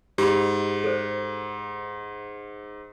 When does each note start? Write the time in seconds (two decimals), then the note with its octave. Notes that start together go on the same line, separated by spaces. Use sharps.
0.18 G#2 G4 B5
0.84 A4 C5